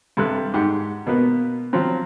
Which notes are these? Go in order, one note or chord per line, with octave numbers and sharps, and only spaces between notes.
G2 C3 A4 F#6
G#2 G4 F#5
B2 A#3 B3
F3 F#3 C4